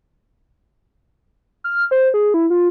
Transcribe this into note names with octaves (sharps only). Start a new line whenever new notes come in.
F6
C5
G#4
E4
F4